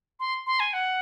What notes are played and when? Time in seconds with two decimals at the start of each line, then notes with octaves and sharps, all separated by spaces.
0.20 C6
0.47 C6
0.60 G#5
0.73 F#5